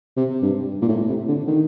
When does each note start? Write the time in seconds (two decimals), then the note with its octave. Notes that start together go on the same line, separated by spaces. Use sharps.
0.17 C3
0.42 G2
0.82 A#2
0.88 A2
1.08 C3
1.28 D3
1.47 D#3